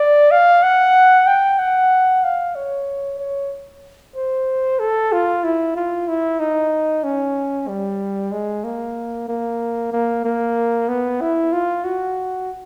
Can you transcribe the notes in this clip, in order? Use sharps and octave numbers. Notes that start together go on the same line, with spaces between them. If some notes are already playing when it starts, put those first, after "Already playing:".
Already playing: D5
F5
F#5
G5
F#5
F5
C#5
C#5
C5
A4
F4
E4
F4
E4
D#4
C#4
G3
G#3
A#3
A#3
A#3
A#3
B3
E4
F4
F#4